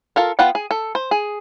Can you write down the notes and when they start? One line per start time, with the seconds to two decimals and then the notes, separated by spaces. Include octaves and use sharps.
0.16 F4 A4 A#4
0.39 B3 F4 F#5 G5
0.55 G#4
0.71 A4
0.95 C5
1.11 G#4